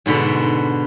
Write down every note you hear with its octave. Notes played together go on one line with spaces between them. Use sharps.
G#2 B2 D3 B5